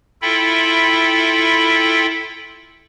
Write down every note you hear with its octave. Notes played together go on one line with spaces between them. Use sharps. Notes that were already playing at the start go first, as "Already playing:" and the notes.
E4 F4 A4 E5 G5 B5